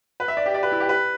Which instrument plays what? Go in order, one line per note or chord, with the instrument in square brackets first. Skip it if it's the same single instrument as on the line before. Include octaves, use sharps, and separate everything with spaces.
[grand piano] B4
E5
D5
G4
D5
B4
E4
G4
B4